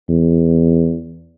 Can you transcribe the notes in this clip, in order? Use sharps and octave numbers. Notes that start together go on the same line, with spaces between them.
E2